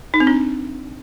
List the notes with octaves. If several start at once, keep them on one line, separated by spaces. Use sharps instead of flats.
D#4
C4
D4